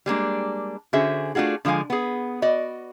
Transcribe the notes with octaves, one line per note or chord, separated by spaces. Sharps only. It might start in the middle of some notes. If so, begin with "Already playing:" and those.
G3 G#3 A#3 D4
D3 C#4 F#4 G#4 C5 E5
A3 D4 F4 F#4 G#4
D3 F3 G#3 F5 G#5
B3 G#4
F#4 D5 D#5